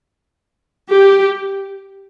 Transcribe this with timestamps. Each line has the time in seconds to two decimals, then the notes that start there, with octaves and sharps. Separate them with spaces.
0.92 G4